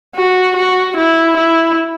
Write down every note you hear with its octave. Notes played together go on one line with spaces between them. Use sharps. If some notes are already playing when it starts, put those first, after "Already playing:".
F#4
F#4
E4
E4